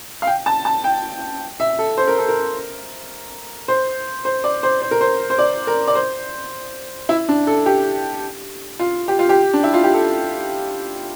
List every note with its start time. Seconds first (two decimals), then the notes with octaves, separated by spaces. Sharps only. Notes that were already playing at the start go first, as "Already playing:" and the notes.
0.22 F5
0.27 G5
0.46 A5
0.65 A5
0.84 G5
1.60 E5
1.79 A4
1.98 C5
2.08 A#4
2.18 A4
2.28 A#4
3.68 C5
4.25 C5
4.44 D5
4.63 C5
4.82 C5
4.91 A#4
5.01 C5
5.30 C5
5.38 D5
5.67 A#4
5.88 D5
5.95 C5
7.09 E4
7.29 D4
7.47 A4
7.66 G4
8.79 F4
9.08 G4
9.19 F4
9.29 G4
9.53 D4
9.64 E4
9.74 F4
9.83 G4
9.94 A4